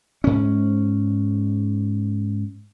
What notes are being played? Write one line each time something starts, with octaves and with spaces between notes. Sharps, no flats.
G#2 C#4